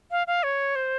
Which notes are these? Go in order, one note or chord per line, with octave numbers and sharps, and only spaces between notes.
F5
F5
C#5
C5